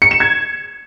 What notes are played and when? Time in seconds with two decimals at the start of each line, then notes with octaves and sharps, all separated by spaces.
0.02 C#7
0.11 E7
0.20 G#6